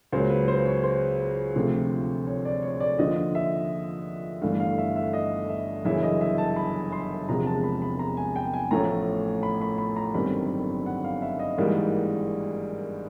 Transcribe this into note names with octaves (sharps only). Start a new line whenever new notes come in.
C#2 C#3 F#3 A#3 C5
B4
C5
C#5
C5
D2 C3 F3 A3
C#5
D5
C#5
D5
D#2 D3 F3 D#5
E5
G1 G2 E3 A3 F5
F5
E5
E5
D#5
E5
G1 F#2 C#3 E3 E5
D#5
E5
A5
B5
C6
E1 E2 C3 F3 G#3 A#5
A5
B5
B5
A#5
G#5
G5
G#5
A1 A2 F3 A3 C#4 A#5
B5
B5
B5
A#5
G1 F#2 D#3 G3 C4 B5
F#5
F5
E5
D#5
G#1 G#2 E3 G3 A#3